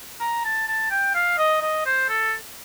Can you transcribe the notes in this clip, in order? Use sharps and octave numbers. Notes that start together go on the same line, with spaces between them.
A#5
A5
A5
G5
F5
D#5
D#5
C5
A4